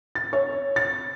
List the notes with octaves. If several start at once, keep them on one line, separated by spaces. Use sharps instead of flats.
A6
C#5
A6